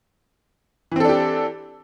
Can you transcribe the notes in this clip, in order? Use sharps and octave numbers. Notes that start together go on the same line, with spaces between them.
E3 C4 D4 G4 A4